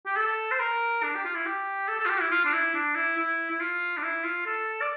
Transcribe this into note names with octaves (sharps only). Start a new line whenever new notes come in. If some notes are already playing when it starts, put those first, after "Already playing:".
G4
A4
C5
A#4
D4
G4
F4
E4
G4
A4
A4
F4
G4
E4
F4
D4
E4
D4
E4
E4
E4
F4
D4
E4
F4
A4
D5